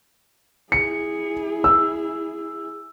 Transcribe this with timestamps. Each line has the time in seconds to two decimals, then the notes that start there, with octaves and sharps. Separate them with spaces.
0.72 E4 G#4 C#7
1.64 E6